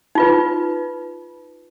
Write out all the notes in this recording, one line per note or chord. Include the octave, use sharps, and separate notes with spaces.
D#4 F4 B4